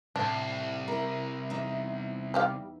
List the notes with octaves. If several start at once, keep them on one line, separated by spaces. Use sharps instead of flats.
C2 A2 D4
E4 A#4
E2 D#4 E5
G3 G4 F5